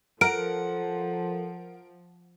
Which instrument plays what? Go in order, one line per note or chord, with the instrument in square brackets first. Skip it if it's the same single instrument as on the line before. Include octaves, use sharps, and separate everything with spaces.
[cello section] F3 [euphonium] A4 [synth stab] A#4 D7 [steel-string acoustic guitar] F#5